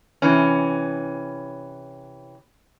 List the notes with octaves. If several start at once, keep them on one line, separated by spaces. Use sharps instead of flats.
C3 E3 C#4